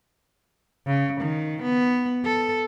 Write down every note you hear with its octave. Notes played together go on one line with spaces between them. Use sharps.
C#3
D#3
B3
A4